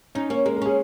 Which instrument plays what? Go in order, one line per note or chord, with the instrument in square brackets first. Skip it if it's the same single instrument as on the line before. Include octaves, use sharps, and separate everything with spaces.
[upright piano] C#4 [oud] D#4
[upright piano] A#3 [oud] C#4
[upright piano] G#3 [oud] A#3
[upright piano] A#4
[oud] C#4 [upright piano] G#4